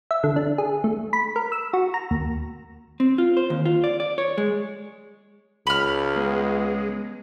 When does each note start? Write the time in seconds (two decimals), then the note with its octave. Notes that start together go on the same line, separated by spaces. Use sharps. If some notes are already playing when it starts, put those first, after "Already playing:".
0.11 E5
0.24 D3
0.36 D4
0.58 G#4
0.84 A3
1.13 B5
1.36 A#4
1.52 E6
1.73 F#4
1.94 A#5
2.11 D#2
3.00 C4
3.18 F4
3.37 C5
3.50 D#2
3.65 F4
3.84 D5
4.00 D5
4.18 C#5
4.38 G#3
5.67 C#2 B5 F6
6.16 G#3 B3